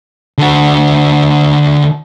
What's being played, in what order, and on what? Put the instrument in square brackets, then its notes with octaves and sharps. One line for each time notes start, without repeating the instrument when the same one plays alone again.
[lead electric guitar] D3 F#4